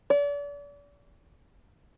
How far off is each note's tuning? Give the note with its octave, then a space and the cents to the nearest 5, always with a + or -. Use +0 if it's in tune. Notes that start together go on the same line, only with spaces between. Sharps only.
D5 -40